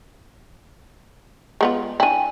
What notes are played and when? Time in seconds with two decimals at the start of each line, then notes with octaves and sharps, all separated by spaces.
1.61 G#3 B3 F4
2.00 D4 E4 G5 G#5 D#7